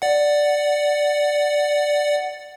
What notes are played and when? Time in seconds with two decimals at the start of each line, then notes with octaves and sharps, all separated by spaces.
0.02 D5 F#5